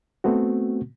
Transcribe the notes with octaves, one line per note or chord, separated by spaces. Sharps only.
A3 B3 C4 F#4